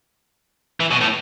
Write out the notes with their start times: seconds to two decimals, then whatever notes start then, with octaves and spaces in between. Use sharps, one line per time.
0.80 E3
0.91 B2
1.01 A2